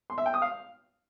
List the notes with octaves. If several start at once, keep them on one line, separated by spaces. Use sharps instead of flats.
C6
E5
G5
D#6
F5